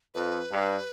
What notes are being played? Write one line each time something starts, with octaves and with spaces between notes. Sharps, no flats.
F2 B4
G2